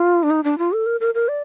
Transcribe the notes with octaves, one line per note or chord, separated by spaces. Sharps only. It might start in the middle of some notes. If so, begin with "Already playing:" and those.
Already playing: F4
D4
D#4
D4
F4
A4
A#4
A#4
A#4
D5